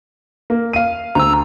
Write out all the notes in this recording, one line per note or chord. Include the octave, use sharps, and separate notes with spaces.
A#3
F5 D#7
D2 A#5 E6